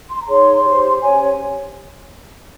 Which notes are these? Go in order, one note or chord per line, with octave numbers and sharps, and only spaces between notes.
C6
A#5
D#4 G#4 C#5 C6
G4 C5
C#4 G4 C#5 G#5